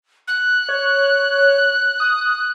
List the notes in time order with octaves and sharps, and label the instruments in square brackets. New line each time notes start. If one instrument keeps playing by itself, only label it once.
[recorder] F#6
[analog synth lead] C#5
D#6